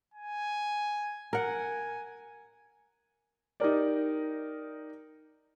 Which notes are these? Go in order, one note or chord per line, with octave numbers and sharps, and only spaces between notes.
G#5
A#4 F#5 G#5
D#4 G4 A#4 D5